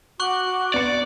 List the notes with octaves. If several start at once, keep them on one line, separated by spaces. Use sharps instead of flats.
F#4 C#6 D6 F#6 F#7
B3 D5 C#7